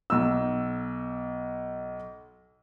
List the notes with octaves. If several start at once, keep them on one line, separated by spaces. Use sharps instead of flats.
B1 E6